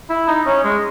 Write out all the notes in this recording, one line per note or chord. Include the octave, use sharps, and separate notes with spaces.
E4
D#4
C#4
G#3